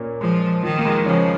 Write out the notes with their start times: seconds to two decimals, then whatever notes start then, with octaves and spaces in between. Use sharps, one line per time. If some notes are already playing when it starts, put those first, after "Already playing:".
Already playing: A#2 A#3 C#4
0.21 F3 G#3
0.63 D#3 F3
0.78 A#3
0.85 G#3
1.06 C#3 F3 C#4